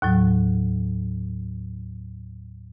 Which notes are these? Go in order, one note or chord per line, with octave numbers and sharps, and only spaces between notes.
D#2 A2 F#3